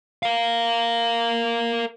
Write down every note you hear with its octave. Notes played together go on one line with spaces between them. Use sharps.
A#4 F5